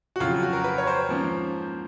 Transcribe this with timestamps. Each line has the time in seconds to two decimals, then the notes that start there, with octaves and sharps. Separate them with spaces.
0.16 F#4
0.20 F2 C#3 F#3 F4
0.43 F#4
0.53 A#4
0.64 B4
0.78 C#5
0.87 C5
1.09 G#2 F3 A#3 C#4